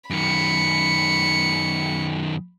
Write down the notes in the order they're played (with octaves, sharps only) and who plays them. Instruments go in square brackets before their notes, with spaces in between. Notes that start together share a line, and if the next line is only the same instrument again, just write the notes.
[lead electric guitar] F#2 D#3 [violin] B5 C#7